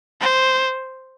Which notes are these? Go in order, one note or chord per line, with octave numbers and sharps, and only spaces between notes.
C5